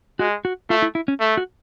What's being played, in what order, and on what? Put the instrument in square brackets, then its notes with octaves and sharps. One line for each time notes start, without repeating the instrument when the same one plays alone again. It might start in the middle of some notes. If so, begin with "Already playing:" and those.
[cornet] G#3 [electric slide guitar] F#4
[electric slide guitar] F#4
[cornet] A3 [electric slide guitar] F4
[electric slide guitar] E4
E4
C#4
[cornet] A3
[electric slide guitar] F#4